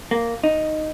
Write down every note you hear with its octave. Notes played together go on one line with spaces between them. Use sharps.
A#3
D#4